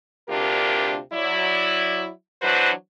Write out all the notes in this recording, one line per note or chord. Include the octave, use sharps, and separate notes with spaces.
D2 C3 D4 F4 G4 A#4
F#3 E4 D5
E3 F#3 D4 F#4 B4 C5